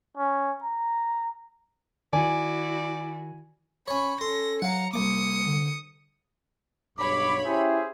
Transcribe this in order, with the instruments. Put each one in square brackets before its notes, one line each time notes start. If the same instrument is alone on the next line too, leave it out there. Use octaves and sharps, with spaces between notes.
[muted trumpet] C#4
A#5
[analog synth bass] D#3 [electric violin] E4 F#4 [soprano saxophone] D5 [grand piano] G#5
[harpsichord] C#4 C#5 [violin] B5 [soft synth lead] C#6
[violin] C#4 A#6 [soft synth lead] A4 [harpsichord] C6
[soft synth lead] F#3 [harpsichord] F5 F#5 [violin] A#5 C#7
[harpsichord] C2 D6 [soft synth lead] A#3 [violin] D#6 C#7
[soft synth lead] D3
[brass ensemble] B1 G2 [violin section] C#5 B5 [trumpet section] D6
[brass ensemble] C#4 E4 G4 [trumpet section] G#4 C5 E5